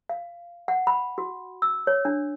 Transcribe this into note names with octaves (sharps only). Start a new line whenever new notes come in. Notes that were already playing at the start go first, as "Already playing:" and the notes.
F5
F#5
B5
F#4
E6
C#5
D4